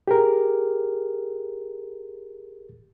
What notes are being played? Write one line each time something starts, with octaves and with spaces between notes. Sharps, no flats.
G4 G#4 A#4